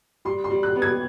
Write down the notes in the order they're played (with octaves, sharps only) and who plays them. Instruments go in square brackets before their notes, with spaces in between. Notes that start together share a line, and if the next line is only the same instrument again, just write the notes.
[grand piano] G3 [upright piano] C6
[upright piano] C6
[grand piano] G3
[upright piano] F#6
[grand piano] B3
[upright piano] G#6